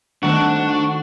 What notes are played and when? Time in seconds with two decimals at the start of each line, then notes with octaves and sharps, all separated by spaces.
0.23 D#3 A3 C4 D4 F#4 A5